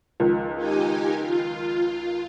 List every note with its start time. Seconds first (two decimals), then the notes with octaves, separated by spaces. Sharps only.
0.20 C#2 D#3 F3
0.56 D#4 G4 G#5
1.19 F4